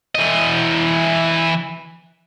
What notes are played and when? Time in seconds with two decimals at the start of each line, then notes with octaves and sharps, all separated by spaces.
0.15 E3 D#5